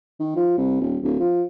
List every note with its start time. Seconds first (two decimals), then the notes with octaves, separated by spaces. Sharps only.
0.20 D#3
0.36 F3
0.57 C2
0.81 D#1
1.03 D1
1.20 F3